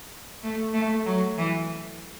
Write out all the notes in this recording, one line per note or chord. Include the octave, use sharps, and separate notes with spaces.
A3
A3
F#3
E3